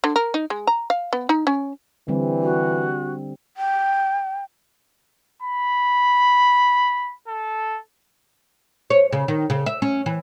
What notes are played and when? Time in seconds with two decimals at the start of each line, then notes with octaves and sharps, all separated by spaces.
0.04 D3
0.16 A#4
0.34 D#4
0.50 G#3
0.67 A#5
0.90 F5
1.13 B3
1.29 D#4
1.47 C#4
2.08 D3 E3 G3 C4
2.42 F#4
3.57 G5
5.43 B5
7.28 A4
8.90 C#5
9.13 C#3
9.28 D#3
9.50 C#3
9.66 E5
9.82 C#4
10.06 E3